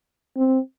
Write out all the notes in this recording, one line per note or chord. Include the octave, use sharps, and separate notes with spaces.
C4